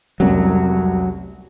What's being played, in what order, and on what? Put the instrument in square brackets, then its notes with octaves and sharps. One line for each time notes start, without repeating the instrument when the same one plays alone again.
[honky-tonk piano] F1 C2 C#4 [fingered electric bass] F#3